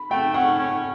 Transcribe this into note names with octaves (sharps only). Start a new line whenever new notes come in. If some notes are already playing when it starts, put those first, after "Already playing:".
Already playing: B5
A3 G5
C#4 F#5
C#4